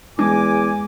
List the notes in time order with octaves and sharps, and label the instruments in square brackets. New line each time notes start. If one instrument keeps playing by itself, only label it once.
[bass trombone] E2 [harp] G#3 [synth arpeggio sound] D4 [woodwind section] G#5 D6